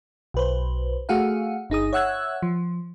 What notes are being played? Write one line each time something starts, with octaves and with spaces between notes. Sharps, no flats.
B1 B4 C5
A3 F#4 G#4 F5 F#5
G1 D#4 G#4 D#6
C#5 E5 F#5 E6 F#6 G#6
F3